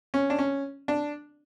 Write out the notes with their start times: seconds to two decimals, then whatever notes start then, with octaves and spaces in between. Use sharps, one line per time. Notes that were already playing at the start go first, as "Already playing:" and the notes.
0.14 C#4
0.30 D4
0.39 C#4
0.88 D4